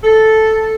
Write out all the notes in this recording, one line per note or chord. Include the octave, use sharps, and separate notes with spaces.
A4